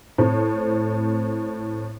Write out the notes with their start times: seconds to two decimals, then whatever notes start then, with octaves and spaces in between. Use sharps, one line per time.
0.18 A2 A3 C4